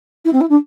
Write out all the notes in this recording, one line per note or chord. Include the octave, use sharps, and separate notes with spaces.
E4
C4
E4
D4